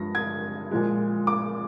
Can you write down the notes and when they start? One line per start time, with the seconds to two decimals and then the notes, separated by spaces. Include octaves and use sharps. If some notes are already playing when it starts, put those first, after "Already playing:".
Already playing: G2 F3 G#3 A#6
0.15 G#6
0.71 A#2 F3 G#3
1.27 D6